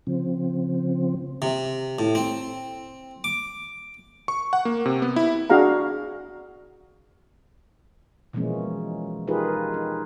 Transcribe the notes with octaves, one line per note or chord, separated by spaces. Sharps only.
C#3 F3 C4
C3
A2
C4
D6
C#6
F#5
A#3
C3
B3
E4
D4 F#4 G#4 F5 A#5
B2 E3 F3 G#3 A#3 C#4
D#4 F4 G4 G#4 A#4 B4
D#4